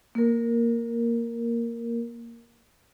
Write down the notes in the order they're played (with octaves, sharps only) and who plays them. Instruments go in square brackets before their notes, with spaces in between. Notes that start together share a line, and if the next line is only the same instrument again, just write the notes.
[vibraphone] A#3 A#4